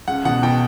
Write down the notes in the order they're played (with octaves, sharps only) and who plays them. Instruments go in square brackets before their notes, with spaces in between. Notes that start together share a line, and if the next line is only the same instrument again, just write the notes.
[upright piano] C#2 [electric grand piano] F#5
[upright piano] B2 [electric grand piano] F#5
[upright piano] B2 [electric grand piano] G5